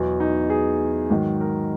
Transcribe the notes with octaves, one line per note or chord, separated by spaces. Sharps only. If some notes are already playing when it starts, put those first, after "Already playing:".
Already playing: E2 B2 F#3
D#4
G#4
G#2 D#3 F#3
A#4